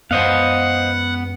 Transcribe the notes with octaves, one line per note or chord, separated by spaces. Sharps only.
F#2 G#3 B3 C5 D#5 F5 F#5